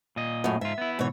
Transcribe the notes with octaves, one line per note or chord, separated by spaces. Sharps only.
A#2 D#5
F#2 A2
G#2 F4 E5
B3 E4
G#2 B2 E3 C#5